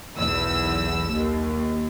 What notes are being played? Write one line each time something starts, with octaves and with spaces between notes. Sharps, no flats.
B1 E2 E6
D#2